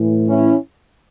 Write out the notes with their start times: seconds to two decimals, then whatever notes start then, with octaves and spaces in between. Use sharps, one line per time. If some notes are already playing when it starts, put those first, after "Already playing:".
Already playing: A2 E3
0.26 C#4 E4